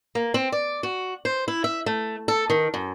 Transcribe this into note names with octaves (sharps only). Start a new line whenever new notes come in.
A#3
C4
D5
F#4
C5
E4
E5
A3
A4
D#3
F#2